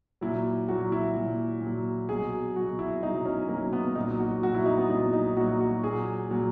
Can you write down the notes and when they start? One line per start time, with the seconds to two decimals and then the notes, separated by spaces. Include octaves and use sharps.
0.21 A#2 F#3 E4
0.68 A#2 F#3 F#4
0.92 E4
1.16 A#2 F#3
1.62 A#2
1.67 F#3
2.09 B2 F#3 G#4
2.56 F#3 F#4
2.60 B2
2.79 E4
3.03 B2 F#3 D#4
3.26 C#4
3.49 F#3 A#3
3.53 B2
3.73 B3
3.96 A#2 F#3 D#4
4.19 F#4
4.42 A#2 F#3 F#4
4.54 E4
4.66 D#4
4.78 B3
4.90 A#2 F#3 B3
5.13 D#4
5.36 A#2 F#4
5.40 F#3
5.60 F#4
5.83 A#2 F#3 G#4
6.30 A#2 F#3